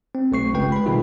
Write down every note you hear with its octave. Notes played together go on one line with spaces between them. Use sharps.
C4
B1 A3 C#6 C7
G1 C#3 G#3 B4 G5
B4 B5
B2 D#3 G3 G#3 D#4 F4